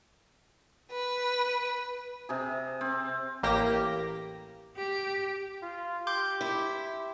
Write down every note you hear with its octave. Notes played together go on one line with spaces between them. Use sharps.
B4
C3 G#4
C4
A1 A#3 G4 A#6
G4
F4
G4 C6 D6 G6
E4